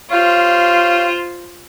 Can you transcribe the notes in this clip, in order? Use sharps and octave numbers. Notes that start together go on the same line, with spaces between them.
F4 G4 C5 C#5 F5